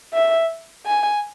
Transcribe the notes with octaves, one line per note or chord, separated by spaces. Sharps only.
E5
G#5